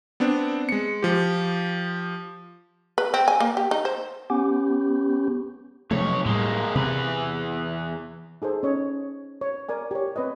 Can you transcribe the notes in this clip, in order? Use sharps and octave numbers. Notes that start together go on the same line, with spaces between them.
B3 C4 D4
G#3 C#7
F3 G4
B4
C4
G#5
A#3
G4
D#4
C5
B3 C#4 G4
B1 C3 F3 A3 C#5
A2 G3 G#3 A#3
E2 C3 B4
D#4 G#4 A4 C5
C#4 C#5 D#5
C#5
A#4 D5 G#5
G4 C#5
C4 B4 C#5 D#5